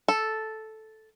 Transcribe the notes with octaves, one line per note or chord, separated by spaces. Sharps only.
A4